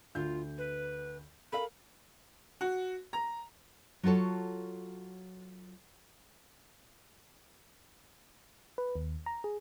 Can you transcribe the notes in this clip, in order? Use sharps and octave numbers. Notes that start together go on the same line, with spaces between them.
D2 F4 G6
B4
A4 A#4 F5 B5
F#4
A#5
F#3 F4 F#4 A4 C#5
B4
D#2
A#5
G#4